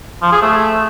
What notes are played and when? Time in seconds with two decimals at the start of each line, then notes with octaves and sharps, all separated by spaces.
0.22 F3
0.32 G#4
0.42 A3